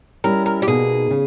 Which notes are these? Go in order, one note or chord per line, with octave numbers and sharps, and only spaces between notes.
G3 C#4 E4 A#4
A#4
G4
B2 A#3 D#4 G#4
C#3